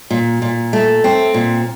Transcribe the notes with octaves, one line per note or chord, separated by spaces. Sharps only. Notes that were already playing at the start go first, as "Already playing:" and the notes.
A#2
A#2
A3
C4
A#2